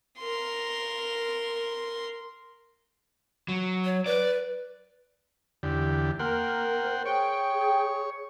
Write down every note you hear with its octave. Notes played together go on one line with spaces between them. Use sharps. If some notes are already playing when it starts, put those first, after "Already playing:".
A#4 C6
F#3
C#5
B4 D5
E2 D3 G4
A#3 A#4 F#5 G5 C6
C5
G#4 C#5 G5